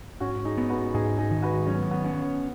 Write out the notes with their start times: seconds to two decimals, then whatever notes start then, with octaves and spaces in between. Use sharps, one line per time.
0.20 G#2 C#4 F#4
0.45 D#4 G#4
0.57 B3
0.70 F#4 B4
0.94 G#2 D#4 G#4
1.18 D#4 G#4
1.31 D#3
1.42 F#4 B4
1.67 F#3 C#4
1.75 B3
1.91 B3
2.04 C#4